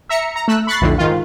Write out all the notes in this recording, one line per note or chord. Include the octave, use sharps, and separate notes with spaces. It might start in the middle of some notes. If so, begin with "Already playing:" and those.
E5 A#5 C#7
A#5
A3 E6 F#6
B5 C#6 F#6 A6 C7
B1 F2 A2 D3
G#2 D#3 F4